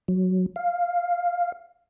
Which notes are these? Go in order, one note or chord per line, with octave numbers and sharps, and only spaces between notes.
F#3
F5